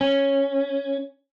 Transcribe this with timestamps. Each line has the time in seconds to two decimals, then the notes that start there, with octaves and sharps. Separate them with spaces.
0.01 C#4